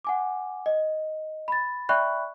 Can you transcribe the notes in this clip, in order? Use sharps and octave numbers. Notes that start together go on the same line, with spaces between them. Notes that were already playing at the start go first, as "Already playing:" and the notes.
F#5 G#5 D6
D#5
B5 A6
D5 E5 G5 B5 C#6 F#6